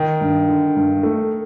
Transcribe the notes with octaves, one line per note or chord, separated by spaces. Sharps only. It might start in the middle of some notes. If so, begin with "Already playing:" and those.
Already playing: D#3
G2
D3
G2
A3